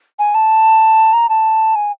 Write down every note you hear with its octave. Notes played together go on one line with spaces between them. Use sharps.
G#5
A5
A#5
A5
G#5